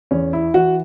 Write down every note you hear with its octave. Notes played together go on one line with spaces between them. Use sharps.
E2 C#4
E4
E3 F#4